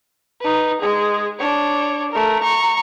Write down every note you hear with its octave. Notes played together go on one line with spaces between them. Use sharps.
D#4 B4
G#3 G#4
D4 C#5
A3 A#4
A#5 C#6